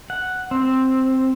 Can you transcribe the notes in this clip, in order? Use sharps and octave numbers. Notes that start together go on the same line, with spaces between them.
F#5
C4